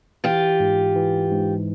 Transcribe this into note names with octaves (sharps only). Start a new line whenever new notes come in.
E3 F4 G4
G#2
E3
G#2